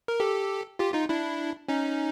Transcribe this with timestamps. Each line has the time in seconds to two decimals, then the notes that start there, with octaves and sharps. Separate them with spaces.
0.08 A#4
0.20 G4 A4
0.79 F4 G4
0.94 D#4 F4
1.09 D4 E4
1.69 C#4 D#4